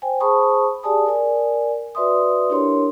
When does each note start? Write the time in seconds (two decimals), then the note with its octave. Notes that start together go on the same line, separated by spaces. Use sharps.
0.02 C5 G5 G#5
0.20 G#4 C5 A5 B5 C#6 D#6
0.83 G4 G#4 D5 G#5 A5 D#6
1.06 A#4 D5 G#5
1.95 F#4 B4 D5 E5 C6 D#6
2.50 D4 E4 G4 A#4 C#5 C6